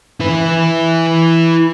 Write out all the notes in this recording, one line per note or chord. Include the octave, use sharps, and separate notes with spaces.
E4 B4